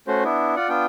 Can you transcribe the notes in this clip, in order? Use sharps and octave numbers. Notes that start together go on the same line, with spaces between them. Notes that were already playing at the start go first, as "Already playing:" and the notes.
A3 C#4 F#4 C5
B3 D4 E4
F4 D5 F#5
B3 D4 F4 G5